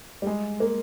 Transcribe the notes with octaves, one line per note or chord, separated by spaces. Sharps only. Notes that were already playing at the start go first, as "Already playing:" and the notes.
G3
G#3
A#3